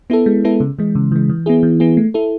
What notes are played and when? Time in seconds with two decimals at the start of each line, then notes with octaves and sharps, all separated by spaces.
0.10 B3 E4 A4
0.26 G#3
0.44 B3 E4 A4
0.60 C#3
0.79 E3 G#3
0.95 C#3
1.12 E3 G#3
1.29 E3
1.46 B3 E4 G#4
1.63 E3
1.80 B3 E4 G#4
1.97 A3
2.14 E4 A4